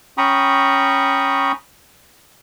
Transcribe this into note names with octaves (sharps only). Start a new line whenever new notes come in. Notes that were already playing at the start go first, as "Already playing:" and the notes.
C#4 G5 A#5 B5 C#6 D#6